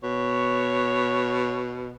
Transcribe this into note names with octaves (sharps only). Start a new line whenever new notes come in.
B2 C#5